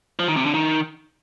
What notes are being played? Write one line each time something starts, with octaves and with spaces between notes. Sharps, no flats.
F3
D#3
C3
D3
D#3